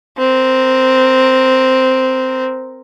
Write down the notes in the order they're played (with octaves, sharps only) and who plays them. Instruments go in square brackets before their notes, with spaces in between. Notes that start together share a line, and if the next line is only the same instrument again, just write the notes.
[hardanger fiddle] C4 A#4